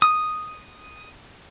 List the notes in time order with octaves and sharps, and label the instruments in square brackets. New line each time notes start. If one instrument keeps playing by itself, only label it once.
[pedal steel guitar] D#6